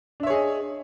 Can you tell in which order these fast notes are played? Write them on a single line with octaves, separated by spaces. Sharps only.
D4 E5 C#5 G#4 D#5